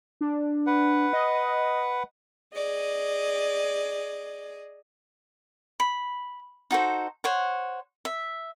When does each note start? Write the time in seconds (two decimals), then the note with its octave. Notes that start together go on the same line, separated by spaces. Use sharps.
0.21 D4
0.67 B4 F#5
1.13 D#5
2.54 G#4 D5 D#5
5.80 B5
6.71 D#4 F#4 A4 C5
7.24 C5 C#5 F#5
8.05 E5